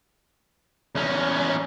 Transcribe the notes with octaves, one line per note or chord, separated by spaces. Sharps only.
E2 C#4